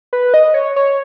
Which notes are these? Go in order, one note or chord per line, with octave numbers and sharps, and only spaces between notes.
B4
D#5
C#5
C#5